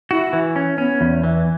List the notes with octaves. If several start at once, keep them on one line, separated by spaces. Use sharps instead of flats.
E4 F#4
E3
C#4
B3 C#4
E2
E3